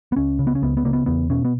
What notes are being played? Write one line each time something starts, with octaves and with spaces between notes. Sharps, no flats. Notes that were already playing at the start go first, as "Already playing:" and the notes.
B3
C#2 C#4
C#3
B3
C#4
C#2 B3
B3
C#3 A#3
B3
E2 B3
B2 C#4
B3